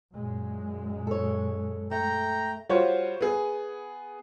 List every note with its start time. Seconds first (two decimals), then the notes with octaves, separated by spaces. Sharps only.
0.14 F#2 A#2 G#3
1.07 A4 C#5
1.91 A3 G5 A#5
2.69 G3 F4 F#4 C5 C#5
3.21 B3 G#4